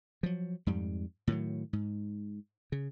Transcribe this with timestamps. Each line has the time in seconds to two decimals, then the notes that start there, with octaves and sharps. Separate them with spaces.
0.23 F3 F#3
0.67 F2 G#2 G3
1.27 A2 D#3 F3 F#3
1.73 G#2
2.72 C#3